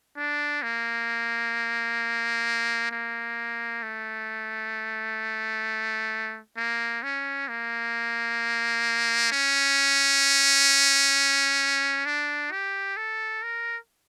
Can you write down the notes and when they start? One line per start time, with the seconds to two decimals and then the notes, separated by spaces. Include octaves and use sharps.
0.17 D4
0.63 A#3
2.91 A#3
3.83 A3
6.57 A#3
7.03 C#4
7.49 A#3
9.32 C#4
12.06 D4
12.52 G4
12.97 A4
13.43 A#4